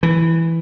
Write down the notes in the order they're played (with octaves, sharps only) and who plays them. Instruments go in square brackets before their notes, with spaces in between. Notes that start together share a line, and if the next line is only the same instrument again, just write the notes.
[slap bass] E3